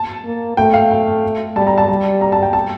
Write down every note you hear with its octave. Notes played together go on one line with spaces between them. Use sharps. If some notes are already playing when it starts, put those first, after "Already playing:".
Already playing: A5
A#3
A3 G5
F5
G5
G3 A5
A#5
A5
G3 A5
A#5
A5
G5
A5